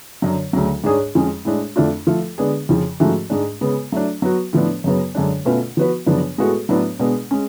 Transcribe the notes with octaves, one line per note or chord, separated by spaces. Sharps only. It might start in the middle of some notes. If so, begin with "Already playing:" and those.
F#2 D3 F#3
D2 C#3 F#3
G#2 G#3 D4 G#4 C#5
F2 F3 G#3 C#4
A2 G#3 D4
F2 F3 A3 D4 F4
F3 A3 F4 A4
D3 G#3 B3 D4 G#4
F2 C#3 F3
G#2 F3 A3 C#4 F#4
G#2 G#3 D4
C#3 G#3 B3
F#3 A3 D4
F#3 B3 F#4
A2 F3 B3 D4
F#2 C#3 F#3 B3
F#2 D3 G#3 D4
B2 A3 C#4 F4 B4
F3 B3 F#4 B4
F#2 C#3 F3 B3 D4
A2 G#3 B3 F#4 A4
A2 F#3 B3 D4
B2 G#3 B3 D4
G#3 C#4